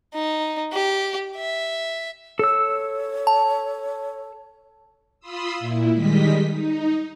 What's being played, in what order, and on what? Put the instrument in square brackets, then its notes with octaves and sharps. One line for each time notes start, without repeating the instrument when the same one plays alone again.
[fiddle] D#4
G4
E5
[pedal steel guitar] A4 E6 [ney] C#5
[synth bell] A5
[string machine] F4 B5 C6 D#6 E6
A#2 E4
D#3 G3 G#3 D#5 B6
D#4